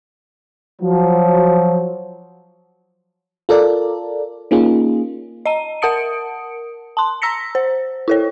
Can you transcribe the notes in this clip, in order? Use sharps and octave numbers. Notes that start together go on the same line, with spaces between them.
F3 F#3
F4 A4 A#4 D5
A#3 C#4 D#4 F4 G#4
D#5 A#5 D#7
A#4 F#5 A5 D#6 C#7 D7
A5 C6
A#5 E6 A#6 B6 C#7
C5
E4 A4 C#5